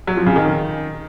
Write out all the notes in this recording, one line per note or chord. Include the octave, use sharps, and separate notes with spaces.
F#3
F3
C#3
D#3